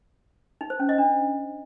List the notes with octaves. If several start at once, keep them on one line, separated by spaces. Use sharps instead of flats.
D#4
C5
C#4
D#5
D4